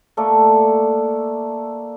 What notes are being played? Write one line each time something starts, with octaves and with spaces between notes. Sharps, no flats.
A3 A#3 A4 D5